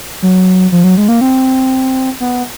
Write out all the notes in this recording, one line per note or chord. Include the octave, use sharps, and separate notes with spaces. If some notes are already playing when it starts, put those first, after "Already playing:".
F#3
F3
F#3
G#3
A#3
C4
B3